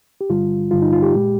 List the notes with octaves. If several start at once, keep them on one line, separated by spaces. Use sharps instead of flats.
G4
G2 D3 G3 F4
G2 D3 G3 F4
D#4
F4
G4
A#2 G#3